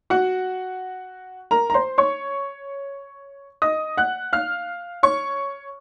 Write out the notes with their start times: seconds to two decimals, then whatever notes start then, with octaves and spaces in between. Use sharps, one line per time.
0.10 F#4 F#5
1.51 A#4 A#5
1.70 A#5
1.74 C5 C6
1.98 C#5 C#6
3.62 D#5 D#6
3.97 F#5 F#6
4.33 F5 F6
5.03 C#5 C#6